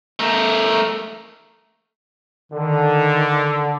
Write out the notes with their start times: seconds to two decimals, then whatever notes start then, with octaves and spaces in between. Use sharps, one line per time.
0.19 A3 A#4
2.52 D3 D#3